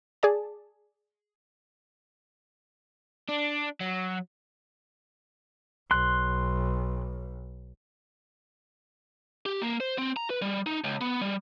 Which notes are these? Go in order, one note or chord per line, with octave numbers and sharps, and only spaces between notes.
G#4 D5 A5
D4
F#3
B1 C6 F#6
G4
A#3
C5
C4
A#5
B4
G3
D#4
C#2
B3
G3